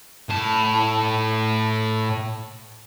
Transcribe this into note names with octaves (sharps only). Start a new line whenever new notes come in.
A2 A5